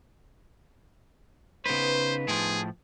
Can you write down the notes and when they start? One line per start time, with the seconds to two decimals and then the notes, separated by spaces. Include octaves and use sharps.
1.65 C#3 B3 D#4 B4 C5
2.28 A2 F3 G#4